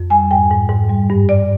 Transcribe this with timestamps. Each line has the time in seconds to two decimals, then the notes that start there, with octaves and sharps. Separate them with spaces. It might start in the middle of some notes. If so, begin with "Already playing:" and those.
Already playing: F2
0.10 G3 G#5
0.31 G#2 G5
0.51 G#2
0.70 G#2
0.89 G3
1.10 G2
1.29 G2 D5